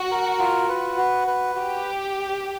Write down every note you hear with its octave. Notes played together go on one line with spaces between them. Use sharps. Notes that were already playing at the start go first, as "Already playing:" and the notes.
Already playing: F#4
A#4
F4
B4
F#4
B4
F#4 G4